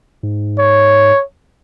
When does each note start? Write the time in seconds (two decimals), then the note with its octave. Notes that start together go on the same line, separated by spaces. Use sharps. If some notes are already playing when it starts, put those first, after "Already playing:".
0.23 G#2
0.58 C#5